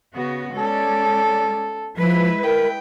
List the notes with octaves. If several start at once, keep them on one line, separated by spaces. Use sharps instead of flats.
C#3 B3 F#4
G#3 C#4 A4 D5
F3 G#3 E4 B4
A#4 G5